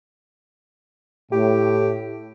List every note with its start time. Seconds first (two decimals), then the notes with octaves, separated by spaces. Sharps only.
1.32 A2 G4